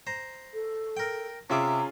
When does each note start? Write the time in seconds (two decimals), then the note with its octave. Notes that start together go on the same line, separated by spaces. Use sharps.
0.07 C5 A#5
0.54 A4
0.97 A#4 G5
1.50 C3 C#4 F4 G#4 E5 A#5 D6